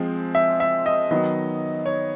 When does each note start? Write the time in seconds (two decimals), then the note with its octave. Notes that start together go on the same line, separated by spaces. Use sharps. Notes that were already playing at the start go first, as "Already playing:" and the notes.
Already playing: F3 G#3 C4
0.35 E5
0.60 E5
0.86 D#5
1.11 D#3 F#3 B3 D#5
1.86 C#5